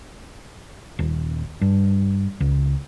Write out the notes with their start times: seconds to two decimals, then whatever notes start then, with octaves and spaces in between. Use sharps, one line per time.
0.99 D#1
1.61 G2
2.40 C#2